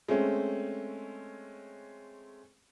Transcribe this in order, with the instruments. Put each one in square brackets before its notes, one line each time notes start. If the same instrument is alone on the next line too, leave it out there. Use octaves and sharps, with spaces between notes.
[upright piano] G#3 A3 C4 C#4